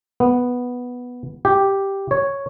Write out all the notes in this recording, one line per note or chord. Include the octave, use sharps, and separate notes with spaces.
B3
G4
C#5